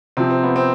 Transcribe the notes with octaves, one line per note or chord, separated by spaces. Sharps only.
C3 F3 C4
C4
B3
C4